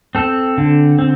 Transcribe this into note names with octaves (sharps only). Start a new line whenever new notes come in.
C4 A4
D3
C4